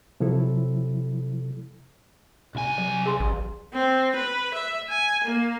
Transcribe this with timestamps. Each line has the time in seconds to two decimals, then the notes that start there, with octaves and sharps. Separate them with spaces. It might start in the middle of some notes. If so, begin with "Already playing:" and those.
0.20 C3 F3 F#3 E4 A4
2.55 C2 G#5
2.78 F#3
3.06 G#4 C6
3.20 A1
3.74 C4
4.16 B4
4.54 E5
4.90 G#5
5.24 A#3